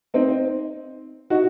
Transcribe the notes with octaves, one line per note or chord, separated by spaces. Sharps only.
C4 D#4
D#4 F#4